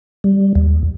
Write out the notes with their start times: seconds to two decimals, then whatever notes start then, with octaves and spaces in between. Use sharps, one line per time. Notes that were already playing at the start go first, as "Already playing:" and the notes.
0.24 G3
0.55 D#2